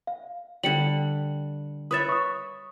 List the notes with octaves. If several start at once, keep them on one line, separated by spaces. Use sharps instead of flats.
F5
D3 G3 C#7 F#7
B4 C#5 E5 D#6 A6
C#6 D#6